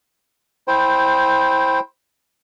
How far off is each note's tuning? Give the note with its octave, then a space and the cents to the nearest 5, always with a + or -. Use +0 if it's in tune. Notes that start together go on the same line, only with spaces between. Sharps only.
E4 -5 C5 +10 G5 +0